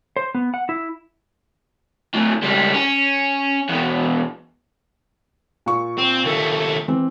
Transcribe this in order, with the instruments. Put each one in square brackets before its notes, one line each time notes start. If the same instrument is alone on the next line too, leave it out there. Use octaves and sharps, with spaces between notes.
[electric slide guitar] C5
B3
F#5
E4
[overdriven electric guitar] D2 A2
C#2 G3
C#4
E2 B2
[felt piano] A#2 C#6
[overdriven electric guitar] C4
D#2 A3
[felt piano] E3 C4